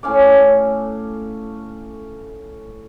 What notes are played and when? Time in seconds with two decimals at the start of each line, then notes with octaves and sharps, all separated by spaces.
0.03 A2 C#4 F5 D6